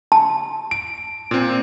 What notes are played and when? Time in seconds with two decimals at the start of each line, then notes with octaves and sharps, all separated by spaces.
0.12 A5
0.71 D7
1.31 A#2 C4